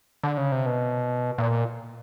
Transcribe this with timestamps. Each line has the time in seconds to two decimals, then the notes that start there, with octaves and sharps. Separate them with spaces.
0.23 D3
0.37 C#3
0.52 C3
0.66 B2
1.38 A#2